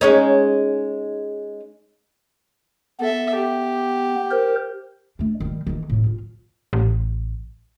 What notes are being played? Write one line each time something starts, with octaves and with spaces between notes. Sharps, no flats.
G#3 C#4 D#4
B3 A4 E5
G4
A#4 C5
A3 D4
D#3 G3
D#3 E3
A2 C4
F4
A1